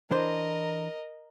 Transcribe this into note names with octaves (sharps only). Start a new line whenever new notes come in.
E3 D4 A#4 C5 D#5